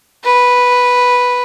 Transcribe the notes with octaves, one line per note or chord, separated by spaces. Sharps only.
B4